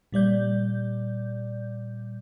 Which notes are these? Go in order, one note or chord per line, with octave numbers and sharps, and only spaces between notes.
A#2 G3 D5 G6